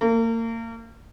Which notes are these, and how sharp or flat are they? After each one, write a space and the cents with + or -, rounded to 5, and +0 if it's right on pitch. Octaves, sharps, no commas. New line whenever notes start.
A#3 -35